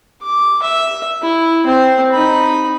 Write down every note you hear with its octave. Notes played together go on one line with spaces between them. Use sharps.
D6
E5
E4
C4 C5
D#4 B5